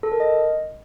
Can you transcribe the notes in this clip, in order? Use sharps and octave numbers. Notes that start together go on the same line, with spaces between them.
A4
A#4
D#5